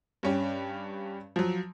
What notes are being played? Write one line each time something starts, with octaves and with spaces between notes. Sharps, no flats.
G2 C#4 G4
F3 F#3